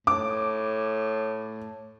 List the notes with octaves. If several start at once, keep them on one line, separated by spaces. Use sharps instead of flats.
A2 D6